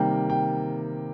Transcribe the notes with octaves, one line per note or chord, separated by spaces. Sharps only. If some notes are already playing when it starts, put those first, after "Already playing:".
Already playing: C3 D#3 G3 A#3 G5
G5